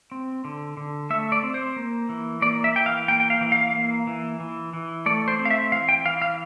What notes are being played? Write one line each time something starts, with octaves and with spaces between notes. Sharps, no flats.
C4
D3
D3
A3 E5
D5
C4
C5
A#3
E3
A#3 D5
E5
E3 G5
F5
A#3 G5
G5
F5
E3
F5
A#3
E3
E3
E3
A3 D5
C5
C4
F5
E5
E3 F5
G5
E3 F5
F5